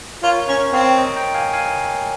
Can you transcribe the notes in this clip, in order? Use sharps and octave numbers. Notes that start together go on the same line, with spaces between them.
F4 A#4 C#5
C#4 A#4 C#5
C4 C#5 F5
D#5 G5
G5 A#5
F5 G#5
F5 G#5